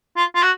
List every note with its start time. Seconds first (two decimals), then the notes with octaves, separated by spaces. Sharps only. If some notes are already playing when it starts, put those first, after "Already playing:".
0.16 F4
0.35 F4
0.43 F#4